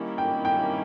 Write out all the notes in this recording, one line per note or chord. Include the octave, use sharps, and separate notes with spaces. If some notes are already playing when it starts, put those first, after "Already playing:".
Already playing: D#3 G3 A#3 C#4 E4
G5
G5